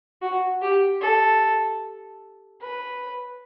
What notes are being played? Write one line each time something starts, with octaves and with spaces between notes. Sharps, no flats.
F#4
G4
A4
B4